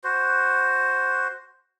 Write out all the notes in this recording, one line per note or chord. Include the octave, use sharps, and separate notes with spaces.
F#4 C5